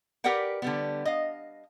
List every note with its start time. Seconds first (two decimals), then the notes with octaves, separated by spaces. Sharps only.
0.24 G4 A#4 B4 D5 F#5 G5
0.62 D3 G3 B3
1.05 D#5 F5